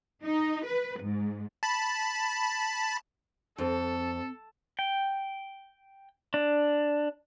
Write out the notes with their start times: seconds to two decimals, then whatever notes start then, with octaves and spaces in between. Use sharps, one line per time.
0.24 D#4
0.66 B4
1.01 G#2
1.63 A5 B5
3.58 F2 C4 A4
4.79 G5
6.34 D4